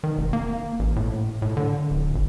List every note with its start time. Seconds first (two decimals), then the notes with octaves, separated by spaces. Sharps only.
0.04 D#3
0.18 F1
0.33 A#3
0.79 A1
0.96 A2
1.42 A2
1.57 D3
1.91 D1
2.15 G#1